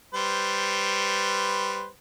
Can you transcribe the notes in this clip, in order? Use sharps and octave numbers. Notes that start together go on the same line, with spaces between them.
G3 B4 C5